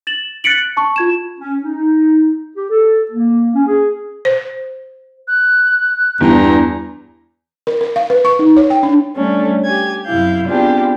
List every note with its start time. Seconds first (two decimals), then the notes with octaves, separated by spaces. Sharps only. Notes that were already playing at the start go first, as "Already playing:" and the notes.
0.07 A6 E7 F#7
0.44 F#6 A6 B6 C#7 D7 F#7
0.77 A5 C#6
0.96 F4 G#6 E7
1.39 C#4
1.63 D#4
2.56 G4
2.70 A4
3.12 A#3
3.55 C#4
3.68 G#4
4.25 C5
5.28 F#6
6.21 E2 G2 A#5
7.67 A#4
7.81 A#4
7.96 F5
8.10 B4
8.25 C#6
8.39 D#4
8.57 C#5
8.70 G5
8.83 D4
9.15 G3 A3 C#4 D4 A4
9.64 G4 G#5 G#6
10.06 F#2 C3 E4 F5 G6
10.46 B3 C4 D4 F4 G4 G#4